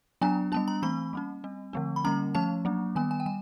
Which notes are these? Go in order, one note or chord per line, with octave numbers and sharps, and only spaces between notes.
F#3 B3 D4 G#5
G3 B3 D4 A5
A#5
E3 A3 C4 B5
G3 A#3 C#4
G3 C4
D3 F3 A3 C4
B5
D3 G3 A#3 C#4 A#5
F3 A3 C#4 A5
F#3 A#3 D4
D#3 G3 B3 G#5
G#5
G5
G3 G#5